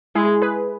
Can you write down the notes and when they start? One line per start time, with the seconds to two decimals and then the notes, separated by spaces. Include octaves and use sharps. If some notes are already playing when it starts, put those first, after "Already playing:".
0.15 G#3 E4 G#4
0.42 G#4 B4